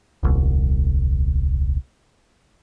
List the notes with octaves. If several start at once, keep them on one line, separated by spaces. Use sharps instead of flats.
D#1 C2